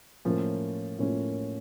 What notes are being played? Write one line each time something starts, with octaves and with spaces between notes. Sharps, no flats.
A2 F3 A#3 C#4 F4
A2 F3 A#3 C#4 F4